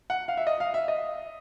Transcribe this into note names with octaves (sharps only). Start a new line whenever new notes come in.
F#5
F5
E5
D#5
F5
E5
D#5